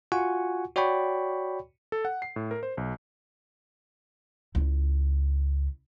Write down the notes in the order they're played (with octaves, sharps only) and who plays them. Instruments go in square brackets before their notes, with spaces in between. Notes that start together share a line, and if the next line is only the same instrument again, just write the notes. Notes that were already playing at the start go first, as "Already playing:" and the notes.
[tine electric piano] F4 F#4 F#5 G#5 C#6
F#4 C#5 D5 G5 B5 C#6
[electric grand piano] A4
F#5
C7
A2
A#4
C5
B1
[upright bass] C#2 E4